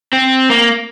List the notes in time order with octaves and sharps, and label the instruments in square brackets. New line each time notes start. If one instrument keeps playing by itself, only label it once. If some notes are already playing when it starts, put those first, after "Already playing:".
[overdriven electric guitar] C4
A#3